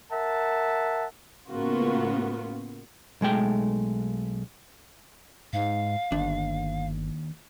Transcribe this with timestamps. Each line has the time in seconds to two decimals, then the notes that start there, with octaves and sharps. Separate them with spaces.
0.12 A#4 E5 F#5 A5
1.49 A2 C#3 A#3 B3 F4 F#4
3.21 B1 G#3 A3 G5
5.53 G#2 F5
6.12 G1 D#2 D4